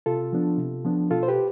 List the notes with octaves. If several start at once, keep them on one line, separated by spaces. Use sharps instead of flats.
C3 F4 A4
F3 B3 D4
C3
F3 B3 D4
B2 F4 A4
C5
G4 B4